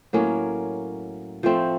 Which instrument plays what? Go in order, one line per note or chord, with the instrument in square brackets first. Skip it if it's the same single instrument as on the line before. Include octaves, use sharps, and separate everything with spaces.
[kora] A2 F#3 A#3 C#4
F3 A3 C4